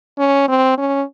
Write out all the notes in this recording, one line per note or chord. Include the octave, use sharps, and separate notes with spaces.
C#4
C4
C#4